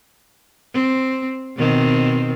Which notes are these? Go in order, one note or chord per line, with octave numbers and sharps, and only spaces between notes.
C4
B2 D#3 C4